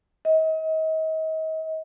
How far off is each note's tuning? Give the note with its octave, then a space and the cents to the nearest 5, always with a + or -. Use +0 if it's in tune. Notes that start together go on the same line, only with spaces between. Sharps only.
D#5 +35